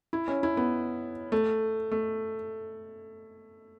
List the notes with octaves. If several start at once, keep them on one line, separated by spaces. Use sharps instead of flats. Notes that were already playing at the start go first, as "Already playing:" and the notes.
E4
C#4
E4
B3
A3
A3